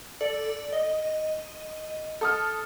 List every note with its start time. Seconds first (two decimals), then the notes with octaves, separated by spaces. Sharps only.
0.21 A4 D5
0.73 D#5
2.21 A4 D#6 F6